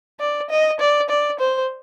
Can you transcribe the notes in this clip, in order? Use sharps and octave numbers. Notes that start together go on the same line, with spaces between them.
D5
D#5
D5
D5
C5